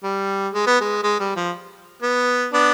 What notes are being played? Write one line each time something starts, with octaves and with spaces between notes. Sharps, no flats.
G3
G#3
B3
G#3
G#3
G3
F3
B3
B3 D4